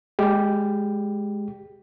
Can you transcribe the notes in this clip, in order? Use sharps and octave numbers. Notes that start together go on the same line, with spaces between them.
G#3 G4